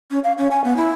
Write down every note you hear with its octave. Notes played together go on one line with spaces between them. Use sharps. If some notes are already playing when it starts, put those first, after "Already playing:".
C#4
F5
C#4
G#5
B3
E4